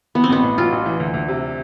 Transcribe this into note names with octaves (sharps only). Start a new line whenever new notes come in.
E3 B3
C4
A1 B3
A2
A1 F4
A1
E3
D2
D2
C3